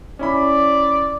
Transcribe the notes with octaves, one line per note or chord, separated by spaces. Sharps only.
C#4 E4 D5 B5